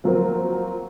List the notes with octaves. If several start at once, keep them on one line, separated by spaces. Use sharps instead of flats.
F3 F#3 A#3 C4